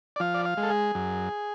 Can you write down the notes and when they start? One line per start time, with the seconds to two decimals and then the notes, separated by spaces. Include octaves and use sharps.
0.16 D5
0.20 F3 F5
0.34 D5
0.45 F5
0.57 G#3
0.63 A4
0.70 G#4
0.95 F#2